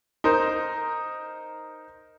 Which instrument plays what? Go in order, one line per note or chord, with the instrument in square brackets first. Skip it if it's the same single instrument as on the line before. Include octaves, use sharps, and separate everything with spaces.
[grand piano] D#4 A#4 C5